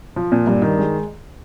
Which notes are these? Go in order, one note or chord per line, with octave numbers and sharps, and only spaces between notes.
F3
A#2
G2
D#3
G#3